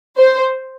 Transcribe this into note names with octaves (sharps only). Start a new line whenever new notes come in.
C5